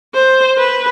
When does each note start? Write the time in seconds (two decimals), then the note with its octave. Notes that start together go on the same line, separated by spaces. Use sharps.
0.14 C5
0.58 B4